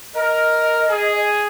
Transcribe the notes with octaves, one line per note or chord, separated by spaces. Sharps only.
A#4 D#5
G#4